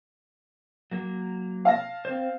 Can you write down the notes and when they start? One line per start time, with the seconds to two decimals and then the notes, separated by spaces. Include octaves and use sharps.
0.91 F#3 A#3
1.65 F5 A5 A#6
2.05 C4 C5